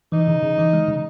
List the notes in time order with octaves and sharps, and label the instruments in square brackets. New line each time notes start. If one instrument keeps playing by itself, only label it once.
[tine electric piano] E3 [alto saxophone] D#4
[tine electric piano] C#3
C#3
E3
G#3
C#3